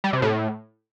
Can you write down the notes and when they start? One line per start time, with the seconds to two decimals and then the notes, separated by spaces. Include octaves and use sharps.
0.04 G3
0.13 C3
0.22 A2